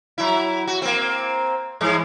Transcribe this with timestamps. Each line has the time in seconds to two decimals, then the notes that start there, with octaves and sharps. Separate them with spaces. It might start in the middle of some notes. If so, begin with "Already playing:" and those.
0.18 F#3 E4
0.67 F#4
0.82 A#3 C4
1.81 G#2 E3 G#3